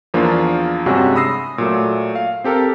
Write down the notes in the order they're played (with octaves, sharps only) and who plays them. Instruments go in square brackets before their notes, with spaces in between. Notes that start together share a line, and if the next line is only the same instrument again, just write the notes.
[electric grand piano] E2 F3 A#3 D4 F4
G2 C3 G#3 C#4 F#4
B5 D#6 E6 A#6 C7
A#2 F#3 A3
F5
C4 G4 A4 A#4